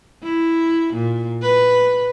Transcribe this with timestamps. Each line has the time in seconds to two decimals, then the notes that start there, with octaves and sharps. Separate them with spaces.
0.23 E4
0.94 A#2
1.42 B4